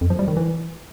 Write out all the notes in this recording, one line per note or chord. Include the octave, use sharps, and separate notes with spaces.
F2
F3
G3
D#3
E3